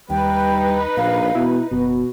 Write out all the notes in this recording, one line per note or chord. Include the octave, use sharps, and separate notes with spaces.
D#2 G3 D#4 B4 G5
A#1 A#2 F5
B2 E4
F#1 B2 F#4